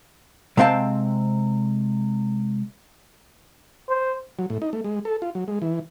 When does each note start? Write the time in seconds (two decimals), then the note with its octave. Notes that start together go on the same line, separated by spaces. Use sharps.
0.57 C3 G#3 C4 F5 G5 A5
3.90 C5
4.39 F#3
4.50 A2
4.62 D#4
4.73 A3
4.84 G#3
5.05 A4
5.22 F4
5.35 F#3
5.48 G#3
5.62 E3